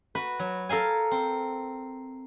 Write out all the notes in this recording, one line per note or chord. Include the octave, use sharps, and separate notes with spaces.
F#4 B4
F#3
A4 A#4 F5 G#5
C4